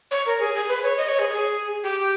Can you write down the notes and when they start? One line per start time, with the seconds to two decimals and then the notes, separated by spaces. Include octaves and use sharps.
0.11 C#5
0.26 A#4
0.39 G#4
0.55 G#4
0.68 B4
0.82 C#5
0.97 D#5
1.08 C#5
1.18 G#4
1.29 G#4
1.83 G4